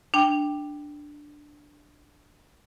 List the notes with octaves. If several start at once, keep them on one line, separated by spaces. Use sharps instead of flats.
D4 G5